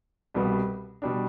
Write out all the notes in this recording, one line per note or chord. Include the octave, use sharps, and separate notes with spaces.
C2 B2 G3 B3
B2 G3 D4